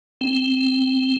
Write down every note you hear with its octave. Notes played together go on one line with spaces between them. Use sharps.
C4